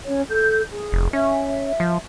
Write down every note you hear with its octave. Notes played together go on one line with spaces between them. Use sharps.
C#4 C#5
A4 G6
G#4
F1
C#4 E5
F3